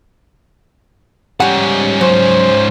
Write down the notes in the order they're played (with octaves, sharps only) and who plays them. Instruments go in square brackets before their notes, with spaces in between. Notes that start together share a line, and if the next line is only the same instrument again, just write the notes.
[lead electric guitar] G#2 C#4 [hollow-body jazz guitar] G3 F#5
[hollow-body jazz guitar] F#3 [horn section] C5